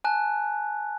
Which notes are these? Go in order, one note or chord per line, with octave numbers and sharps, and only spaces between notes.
G#5 A5 F#6